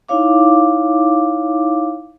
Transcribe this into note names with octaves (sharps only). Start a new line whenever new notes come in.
D#4 E4 C#5 F5 D6